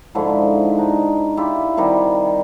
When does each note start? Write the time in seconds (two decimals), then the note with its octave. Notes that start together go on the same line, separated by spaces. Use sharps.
0.15 G#2 D3 F3 E4
0.78 D4 D#4
1.37 E4 F4 G4
1.77 C3 D#3 G3 F#4